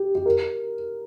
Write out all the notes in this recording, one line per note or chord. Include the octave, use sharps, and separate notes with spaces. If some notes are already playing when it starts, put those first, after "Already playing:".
Already playing: G4
G4
A#4